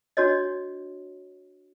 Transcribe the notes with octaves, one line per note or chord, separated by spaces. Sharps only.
D4 F#4 C#5 D#5